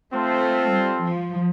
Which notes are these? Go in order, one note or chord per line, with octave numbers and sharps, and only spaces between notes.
A3 C4 F4 A4 C5
G3
F3